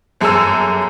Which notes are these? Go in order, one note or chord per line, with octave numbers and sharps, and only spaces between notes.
G1 F#2 G#4 A4 G#5 E6